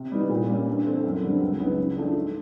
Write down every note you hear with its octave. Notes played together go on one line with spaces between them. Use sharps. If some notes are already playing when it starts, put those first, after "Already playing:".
Already playing: C3
E3 G3 B3 D#4
A#2
G3 A#3 C#4
G2
E3 A3 C4
F#2
D3 G3 C4
C#2
C#3 F#3 B3 D#4
C#3
F3 A3 D4
G#2